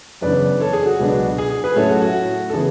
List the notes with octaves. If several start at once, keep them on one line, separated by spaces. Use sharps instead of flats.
F#2 C#3 E3 B3 D4 B4 D5
A4 C#5
G#4
F#4
C#2 B2 F#3 B3 D4
G#4
G#4
G#4 B4
A2 F#3 C#4 E4 A4 C#5
F#4 A4
F#4
A4
C#3 E3 B3 G#4